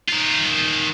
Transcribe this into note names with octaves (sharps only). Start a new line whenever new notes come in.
D#3 F4